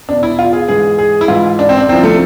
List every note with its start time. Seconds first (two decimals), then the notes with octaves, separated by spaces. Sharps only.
0.08 E2 B2 D4
0.23 E4
0.39 F4
0.53 G#4
0.68 G#2 E3 G#4
0.99 G#4
1.21 E4
1.28 G#2 E3 F4
1.59 D4
1.69 C4
1.78 D4
1.88 C2 C3 F3 C4
2.04 A3